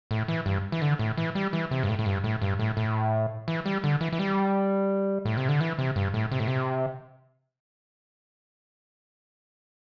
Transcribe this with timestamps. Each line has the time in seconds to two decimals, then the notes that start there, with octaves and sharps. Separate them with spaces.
0.11 A2
0.28 E3
0.46 G2
0.72 E3
0.82 D3
0.99 A2
1.17 E3
1.35 G3
1.53 E3
1.71 C3
1.83 G2
1.89 A2
1.99 A2
2.06 G2
2.24 A2
2.42 G2
2.59 A2
2.77 A2
3.48 E3
3.66 G3
3.84 D3
4.01 E3
4.12 E3
4.19 G3
5.25 A2
5.37 C3
5.49 D3
5.61 E3
5.79 C3
5.96 G2
6.14 A2
6.32 C3
6.40 A2
6.48 C3